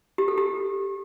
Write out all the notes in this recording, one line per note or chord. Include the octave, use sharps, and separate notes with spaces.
G4
A4
G4